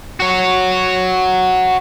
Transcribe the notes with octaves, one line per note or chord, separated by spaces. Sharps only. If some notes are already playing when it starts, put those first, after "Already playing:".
F#4 C#5